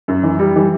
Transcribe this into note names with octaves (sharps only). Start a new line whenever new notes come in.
F#2
E3
G3
E3